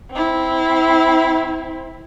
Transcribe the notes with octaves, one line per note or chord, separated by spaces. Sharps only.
C4 E4